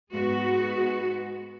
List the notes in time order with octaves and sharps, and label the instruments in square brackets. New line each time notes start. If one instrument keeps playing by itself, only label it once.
[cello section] G#2 G#3 B3 F#4